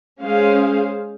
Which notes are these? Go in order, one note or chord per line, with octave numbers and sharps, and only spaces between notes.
G#3 C#4 G#4 C5 F5